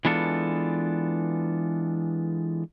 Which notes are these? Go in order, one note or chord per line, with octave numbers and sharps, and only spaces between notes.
E3 G#3 B3 D4 F4 A4